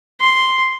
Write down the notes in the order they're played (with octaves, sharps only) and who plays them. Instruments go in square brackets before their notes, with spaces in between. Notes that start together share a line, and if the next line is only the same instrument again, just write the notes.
[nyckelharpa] C6